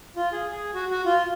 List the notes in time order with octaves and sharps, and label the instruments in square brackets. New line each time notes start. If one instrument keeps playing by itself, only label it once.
[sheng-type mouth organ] F4
G#4
G#4
F#4
F#4
F4